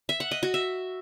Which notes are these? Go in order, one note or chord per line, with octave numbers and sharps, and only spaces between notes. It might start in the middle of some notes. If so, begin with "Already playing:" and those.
E5
F#5
D#5
F#4
E5